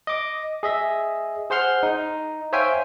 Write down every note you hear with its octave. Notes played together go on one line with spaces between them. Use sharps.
D#5 D6
G#4 D#5 E5
G#4 C5 F#5 C6 F6
D#4
C5 C#5 E5 F5 G5 G#5